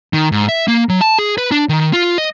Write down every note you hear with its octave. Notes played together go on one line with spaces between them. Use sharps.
D#3
G#2
E5
A#3
F#3
A5
G#4
B4
D4
D#3
F4
D#5